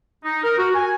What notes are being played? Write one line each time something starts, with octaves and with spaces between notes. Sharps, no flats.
D#4
A#4
F#4
G#5